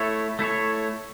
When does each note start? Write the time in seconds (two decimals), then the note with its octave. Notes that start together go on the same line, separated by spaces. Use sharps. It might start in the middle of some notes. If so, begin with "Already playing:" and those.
Already playing: A3 E4 A4 C#5
0.39 A3 E4 A4 C#5